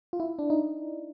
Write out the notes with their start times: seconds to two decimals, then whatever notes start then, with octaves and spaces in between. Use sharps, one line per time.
0.13 F4
0.20 E4
0.39 D4
0.50 D#4